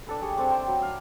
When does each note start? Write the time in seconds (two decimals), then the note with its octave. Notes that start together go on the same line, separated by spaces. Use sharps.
0.07 D4 A4 B4
0.21 G3 G#4 C#5
0.37 C4 D4 A4 C#5
0.50 E5 G5 A#5 C6
0.67 F#3 B5
0.82 F5